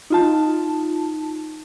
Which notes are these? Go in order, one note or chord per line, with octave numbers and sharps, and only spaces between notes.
D#4 F4 A5